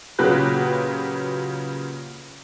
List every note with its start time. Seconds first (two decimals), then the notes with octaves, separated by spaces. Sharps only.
0.19 A#2 C#3 F#3 G4 B4 F#6